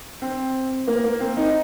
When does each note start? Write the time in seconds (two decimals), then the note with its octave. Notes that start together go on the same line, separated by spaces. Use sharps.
0.22 C4
0.88 A#3
1.04 A#3
1.20 C4
1.37 D#4